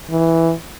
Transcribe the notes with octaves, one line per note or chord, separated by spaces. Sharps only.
E3